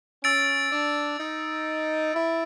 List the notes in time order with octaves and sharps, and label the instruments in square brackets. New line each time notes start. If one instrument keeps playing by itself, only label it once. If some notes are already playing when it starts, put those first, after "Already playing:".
[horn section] C#4 [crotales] E6 A6 D7
[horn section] D4
D#4
E4